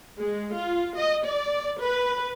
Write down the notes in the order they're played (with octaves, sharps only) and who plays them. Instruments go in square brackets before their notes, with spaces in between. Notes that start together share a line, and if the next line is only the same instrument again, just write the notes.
[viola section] G#3
F4
D#5
D5
B4